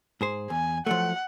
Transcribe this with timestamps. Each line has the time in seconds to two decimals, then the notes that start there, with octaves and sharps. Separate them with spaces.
0.21 G#2 G#4 C5
0.50 E2 G#5
0.86 F3 F#3 A3 F#5